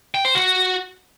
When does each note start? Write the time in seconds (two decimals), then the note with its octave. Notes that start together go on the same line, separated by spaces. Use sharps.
0.15 G5
0.25 C5
0.35 F#4